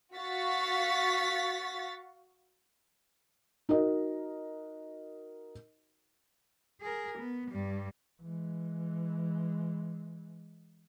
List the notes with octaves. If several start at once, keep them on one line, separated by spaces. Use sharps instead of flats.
F#4 F5 C#6 A6 B6
D#4 F#4 A#4 D#5
G#4 A#4
B3
G2 G3
E3 G#3